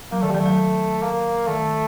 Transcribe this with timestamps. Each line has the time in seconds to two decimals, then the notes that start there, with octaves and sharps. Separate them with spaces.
0.12 F#3 A#3
0.21 D#3 A3
0.31 F#3 G3
0.40 A3
0.46 F#3
1.02 A#3
1.47 D#3 A3